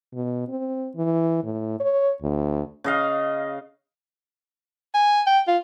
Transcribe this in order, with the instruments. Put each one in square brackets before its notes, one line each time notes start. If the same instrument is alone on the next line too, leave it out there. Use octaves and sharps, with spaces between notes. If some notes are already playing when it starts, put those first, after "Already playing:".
[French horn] B2
C4
E3
A2
C#5
D2
[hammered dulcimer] C#3 D#5 F5
[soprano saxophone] G#5
G5
F4